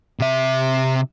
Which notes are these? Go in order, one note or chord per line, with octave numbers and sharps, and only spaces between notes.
C3 E5